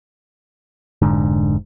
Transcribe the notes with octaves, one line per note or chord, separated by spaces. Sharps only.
F1 G#2 D3